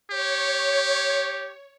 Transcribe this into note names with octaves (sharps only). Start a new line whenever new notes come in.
G4 C#5